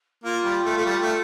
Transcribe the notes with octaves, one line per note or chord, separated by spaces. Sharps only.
A#3 F4
G3
A3
A3
G3
A3